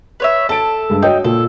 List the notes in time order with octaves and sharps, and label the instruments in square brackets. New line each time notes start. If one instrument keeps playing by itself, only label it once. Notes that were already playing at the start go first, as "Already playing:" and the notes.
[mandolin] B4 C#5 E5
[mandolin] A4 [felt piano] A5 D7
[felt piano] G2 G#3
[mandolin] D#4 [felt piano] F#4 C#5 G5
[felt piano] A#2 [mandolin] A4